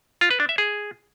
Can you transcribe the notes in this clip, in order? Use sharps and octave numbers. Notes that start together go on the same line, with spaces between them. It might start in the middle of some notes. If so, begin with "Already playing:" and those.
F4
B4
D4
E5
G#4